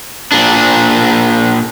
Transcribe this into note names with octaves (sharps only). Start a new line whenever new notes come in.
A#2 D4